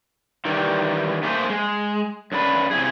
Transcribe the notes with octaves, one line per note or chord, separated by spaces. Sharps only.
D#3 E3 G3
A3 A#3 G#4 A#4 C5
G#3
F#2 D4 F#4 B4
C3 E4 G#4